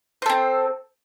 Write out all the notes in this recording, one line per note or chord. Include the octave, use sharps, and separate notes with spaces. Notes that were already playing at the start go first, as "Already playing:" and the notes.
C4 A4 C5